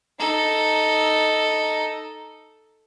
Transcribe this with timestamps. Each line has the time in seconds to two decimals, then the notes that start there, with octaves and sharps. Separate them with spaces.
0.19 D#4 A4